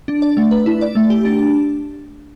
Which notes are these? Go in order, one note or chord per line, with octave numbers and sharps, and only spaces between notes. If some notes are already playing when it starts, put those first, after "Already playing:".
D4
D5
A3
B4
E4
D5
A3
G4
D4